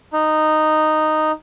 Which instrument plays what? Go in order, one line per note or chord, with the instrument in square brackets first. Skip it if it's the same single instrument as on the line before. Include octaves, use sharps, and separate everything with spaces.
[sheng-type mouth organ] D#4